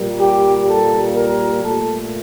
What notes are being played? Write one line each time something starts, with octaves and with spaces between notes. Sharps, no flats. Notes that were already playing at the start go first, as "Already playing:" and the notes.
Already playing: A#2 G3 A#3
G4
A4
A#4
A#2 A3 A4